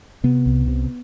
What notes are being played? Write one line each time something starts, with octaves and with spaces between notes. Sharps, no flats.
C3 B3
C2
C3